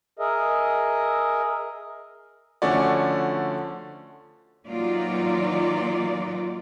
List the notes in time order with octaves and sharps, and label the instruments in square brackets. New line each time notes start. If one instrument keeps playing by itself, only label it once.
[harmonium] G#4 A#4 D#5 E5
[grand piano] D3 F3 A3 C#4 F#4 D5
[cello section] E3 F#3 A#3 D#4 F4 D5